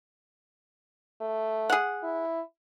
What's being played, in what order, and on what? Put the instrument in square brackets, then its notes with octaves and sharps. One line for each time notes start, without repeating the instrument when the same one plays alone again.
[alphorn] A3
[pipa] G#4 F#5
[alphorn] E4